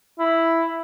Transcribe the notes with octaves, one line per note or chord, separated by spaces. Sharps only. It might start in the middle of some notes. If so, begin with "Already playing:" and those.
E4